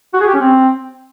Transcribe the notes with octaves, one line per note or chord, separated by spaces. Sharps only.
F#4
G#4
G4
C#4
C4